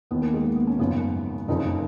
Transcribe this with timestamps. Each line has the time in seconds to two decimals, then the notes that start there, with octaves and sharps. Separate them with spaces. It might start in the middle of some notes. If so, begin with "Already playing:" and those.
0.11 D#2 D#3 B3
0.22 A#3
0.34 G#3
0.45 A#3
0.56 B3
0.67 C#4
0.75 A#3
0.79 G#1 F#2 C#3 F3 B3
1.48 F#1 F2 C#3 F3 D#4